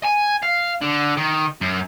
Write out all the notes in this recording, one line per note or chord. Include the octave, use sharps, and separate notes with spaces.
G#5
F5
D3
D#3
F#2